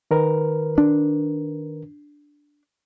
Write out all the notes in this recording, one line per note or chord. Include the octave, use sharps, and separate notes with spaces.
D#3 A#4 B4
D4